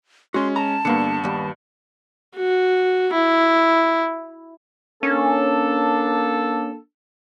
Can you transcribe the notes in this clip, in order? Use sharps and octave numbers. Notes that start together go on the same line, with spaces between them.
G#3 C#4 F#4 C6
A5 A#5
G2 D3 A#3 B3 C#7
D#2 G3
F#4
E4
A#3 C#4 D4 A4